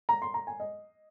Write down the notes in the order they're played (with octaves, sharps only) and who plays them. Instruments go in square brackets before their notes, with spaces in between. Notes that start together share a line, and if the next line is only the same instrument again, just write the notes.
[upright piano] A#5
C6
A#5
G#5
D#5